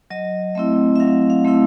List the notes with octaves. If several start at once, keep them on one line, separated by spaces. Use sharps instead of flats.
F#3 D#5
A3 C4 E4 E5
E5
F#3 F5
F5
A3 C4 E4 F5